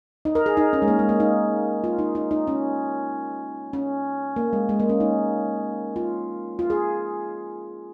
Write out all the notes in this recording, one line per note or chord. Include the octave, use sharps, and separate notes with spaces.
D#4
A#4
G#4
D#4
C#4
G#3
A#3
G#3
A#3
D#4
F4
D#4
D#4
D#4
C#4
C#4
A#3
G#3
G#3
A#3
C#4
D#4
F4
F4
G#4